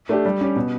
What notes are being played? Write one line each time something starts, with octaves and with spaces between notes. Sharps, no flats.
A3 D4 G4
G3
C#4 G4
B2